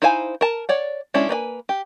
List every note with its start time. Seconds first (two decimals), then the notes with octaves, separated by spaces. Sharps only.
0.02 D#4 E4 C5 F5 G#5
0.41 A#4 A5
0.69 C#5 D5 F#5
1.14 G#3 C#4 D4 E4
1.29 A#3 B4 D#5 G#5
1.69 G4